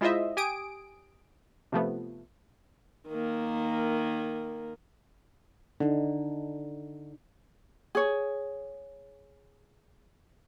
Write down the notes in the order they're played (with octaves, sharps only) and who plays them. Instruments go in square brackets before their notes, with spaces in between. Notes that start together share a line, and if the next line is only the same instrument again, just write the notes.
[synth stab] G#3 E4 F4 C5 D#5 E5
G4 G#5 D#6 D7
C3 F3 A3 B3
[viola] D#3 A#3
[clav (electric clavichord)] D3 [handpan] D4 D#4
[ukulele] G#4 C#5